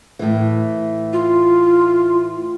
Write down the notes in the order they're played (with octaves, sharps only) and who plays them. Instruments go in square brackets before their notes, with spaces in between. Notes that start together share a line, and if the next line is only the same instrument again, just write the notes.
[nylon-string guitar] A2 E3
[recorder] F4